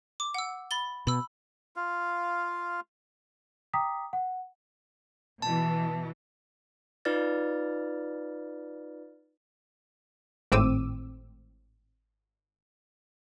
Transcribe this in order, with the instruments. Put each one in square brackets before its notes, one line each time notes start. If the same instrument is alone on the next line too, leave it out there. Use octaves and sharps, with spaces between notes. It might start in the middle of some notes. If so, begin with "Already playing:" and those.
[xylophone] D6
F#5 E6
B5 A6 G7
[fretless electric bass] B2 [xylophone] B5 E6
[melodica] F4 F5
[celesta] G5 A#5 D6 D#6 B6
F#5
[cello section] B2 E3 [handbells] A5
[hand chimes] D#4 F4 B4 D5 F6 A6
[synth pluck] G#1 A2 C4 D6 E6 D#7